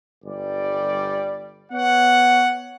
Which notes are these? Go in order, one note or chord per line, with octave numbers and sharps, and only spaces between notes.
G1 G3 D5
B3 C#5 F#5